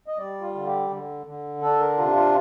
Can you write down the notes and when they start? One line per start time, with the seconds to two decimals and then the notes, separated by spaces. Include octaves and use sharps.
0.08 D#5
0.18 G3 D5
0.41 F4
0.55 D3
0.67 G4
0.90 D3
1.26 D3
1.62 D4 A4
1.80 A#4
1.98 C3 F4
2.16 F4